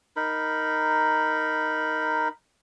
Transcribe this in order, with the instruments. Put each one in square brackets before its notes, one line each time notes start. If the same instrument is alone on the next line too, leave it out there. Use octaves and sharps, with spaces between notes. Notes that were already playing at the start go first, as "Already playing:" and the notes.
[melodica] D#4 A#4 B5